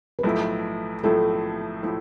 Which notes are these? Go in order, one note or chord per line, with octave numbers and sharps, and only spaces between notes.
B4
B1 A2 F3 A3 E4 A4
B1 A2 F3 A3 E4 A4
A2 F3 A3 E4